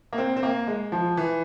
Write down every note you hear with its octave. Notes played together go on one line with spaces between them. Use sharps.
A#3
C4
C4
A#3
G#3
F3
E3